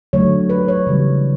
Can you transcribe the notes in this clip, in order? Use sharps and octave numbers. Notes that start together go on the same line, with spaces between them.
D3 F#3 A3 C#5
B4
C#5
C#3 E3 G3